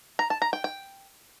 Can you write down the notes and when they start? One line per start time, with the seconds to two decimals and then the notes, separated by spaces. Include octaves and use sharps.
0.19 A#5
0.30 A5
0.42 A#5
0.53 G5
0.64 G5